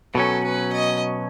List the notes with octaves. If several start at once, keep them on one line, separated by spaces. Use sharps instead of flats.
B2 F#3 C#4 A4
B4
D#5